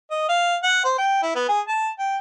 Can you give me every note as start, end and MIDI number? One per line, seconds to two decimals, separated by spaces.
0.11 0.25 75
0.29 0.56 77
0.63 0.83 78
0.85 0.94 72
0.98 1.21 79
1.23 1.35 64
1.35 1.48 59
1.49 1.61 68
1.68 1.90 81
1.99 2.18 79